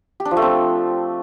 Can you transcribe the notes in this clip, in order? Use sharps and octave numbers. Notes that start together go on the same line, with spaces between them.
G4
D4
F3
A3
C4